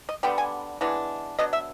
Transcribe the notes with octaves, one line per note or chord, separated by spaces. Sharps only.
D#5
D3 G3 B3 D4 G5
G#5
E3 G#3 B3 D4
F#3 B3 D4 D#5
E5